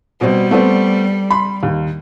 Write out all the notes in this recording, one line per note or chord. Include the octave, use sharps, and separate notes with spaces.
B2 G3 C4
A3 B3 C4
B5 C6
D#2